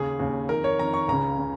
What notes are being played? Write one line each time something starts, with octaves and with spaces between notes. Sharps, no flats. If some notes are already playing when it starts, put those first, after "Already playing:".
Already playing: D#2 C#3 G#4
D#2 C#3
F2 D#3 A#4
C#5
F2 D#3 A#5
C#6
C#2 C#3 A#5
C#3